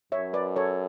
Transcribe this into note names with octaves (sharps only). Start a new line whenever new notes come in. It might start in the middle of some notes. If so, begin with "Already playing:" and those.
F#2 C#5 E5
B4 D5
A4 C#5